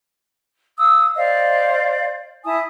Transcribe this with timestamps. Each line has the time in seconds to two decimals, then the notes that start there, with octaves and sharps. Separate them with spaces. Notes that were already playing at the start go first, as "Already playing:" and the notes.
0.78 F5 D#6 E6
1.16 C5 D5 D#5 F5
2.45 E4 G#5 A5 D#6